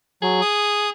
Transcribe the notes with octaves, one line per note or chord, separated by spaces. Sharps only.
F#3 G#4
D#6